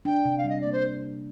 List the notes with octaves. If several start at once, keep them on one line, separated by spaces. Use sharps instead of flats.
D4 G5
C3
F5
G3 D#5
A#3 D5
C5